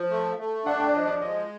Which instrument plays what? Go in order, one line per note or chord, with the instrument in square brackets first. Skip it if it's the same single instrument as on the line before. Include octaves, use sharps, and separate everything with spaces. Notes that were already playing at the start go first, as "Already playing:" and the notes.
Already playing: [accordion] F3
A3
A3
[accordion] D4 [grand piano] F#5
[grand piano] G5
D5
[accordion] F3 [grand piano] D#5
[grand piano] D5
[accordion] G#3 [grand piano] D#5